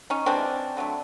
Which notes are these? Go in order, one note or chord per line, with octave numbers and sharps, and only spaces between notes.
C#4 D#4
C3 E3 G#3 B3 C4 D4
D3 F#3 A3